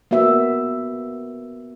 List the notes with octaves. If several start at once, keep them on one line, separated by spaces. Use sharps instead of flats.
A#3 B3 F#4 E5